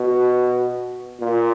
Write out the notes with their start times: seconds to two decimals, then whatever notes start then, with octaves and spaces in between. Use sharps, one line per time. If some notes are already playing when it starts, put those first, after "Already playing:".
Already playing: B2
1.20 A#2